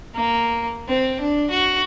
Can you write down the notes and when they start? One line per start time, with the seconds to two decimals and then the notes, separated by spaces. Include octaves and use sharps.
0.15 A#3
0.88 C4
1.20 D4
1.50 F#4